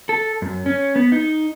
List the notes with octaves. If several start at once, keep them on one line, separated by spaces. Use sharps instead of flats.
A4
F#2
C#4
B3
D#4